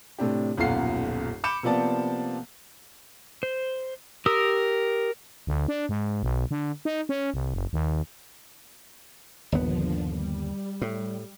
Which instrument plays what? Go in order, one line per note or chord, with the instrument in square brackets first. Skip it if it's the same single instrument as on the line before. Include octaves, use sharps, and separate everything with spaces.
[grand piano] A2 C3 D4 G4
D#1 B1 F#2 F4 F#5 C7
B5 D6 G6 C#7 E7
C3 F3 A#3 B3 D5 A5
[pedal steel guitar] C5
[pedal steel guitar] G4 D#6 E6 [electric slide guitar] A#4
[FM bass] D2
D4
G#2
B1
D3
D#4
C#4
C2
F#1
D#2
[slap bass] G1 D#2 B3 [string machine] A#2 D3 F3
[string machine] G3
[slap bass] A2